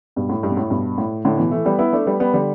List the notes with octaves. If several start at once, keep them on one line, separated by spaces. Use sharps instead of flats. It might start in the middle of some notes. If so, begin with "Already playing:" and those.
G2 B2
A2
G2
B2
A2
G2 B2
A2
A2 D3
B2 E3
E3 A3
G3 B3
B3 E4
A3 D4
G3 B3
G3 B3
D3 G3